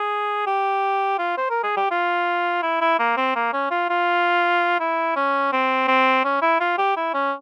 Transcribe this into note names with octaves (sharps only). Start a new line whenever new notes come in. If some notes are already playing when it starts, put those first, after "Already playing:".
Already playing: G#4
G4
F4
C5
A#4
G#4
G4
F4
E4
E4
A#3
C4
A#3
C#4
F4
F4
E4
C#4
C4
C4
C#4
E4
F4
G4
E4
C#4